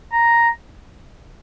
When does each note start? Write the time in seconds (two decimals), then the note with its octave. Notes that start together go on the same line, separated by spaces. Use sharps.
0.13 A#5